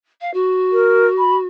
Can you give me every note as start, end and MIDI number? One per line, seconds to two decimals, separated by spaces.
0.21 0.33 77
0.33 1.47 66
0.72 1.07 70
1.19 1.37 83